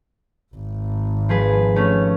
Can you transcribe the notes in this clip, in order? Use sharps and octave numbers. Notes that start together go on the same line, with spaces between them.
G#1
F3 G#4 B4
A3 C#4